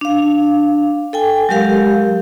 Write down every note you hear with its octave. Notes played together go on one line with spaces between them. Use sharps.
D4 F5
A4 G5 G#5
F#3 G#3 G4 A#4 F5